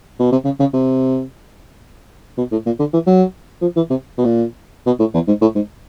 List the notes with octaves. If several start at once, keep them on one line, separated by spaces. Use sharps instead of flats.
B2
C3
C#3
C#3
C3
B2
A2
A#2
D3
E3
F#3
F3
E3
C3
B2
A#2
B2
A2
E2
G#2
A2
G#2